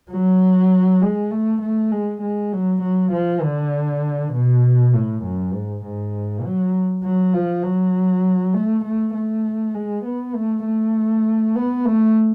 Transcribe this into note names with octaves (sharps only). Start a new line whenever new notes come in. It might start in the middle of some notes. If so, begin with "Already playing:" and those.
F#3
G#3
A3
A3
G#3
G#3
F#3
F#3
F3
D3
B2
A2
F#2
G#2
G#2
F#3
F#3
F3
F#3
A3
A3
A3
G#3
B3
A3
A3
B3
A3